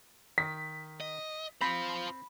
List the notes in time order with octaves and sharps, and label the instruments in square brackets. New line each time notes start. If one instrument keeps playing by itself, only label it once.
[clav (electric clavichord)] D#3 [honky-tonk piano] B6
[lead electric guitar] D#5
[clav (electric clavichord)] C4 [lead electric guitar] F4 C5 [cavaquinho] B5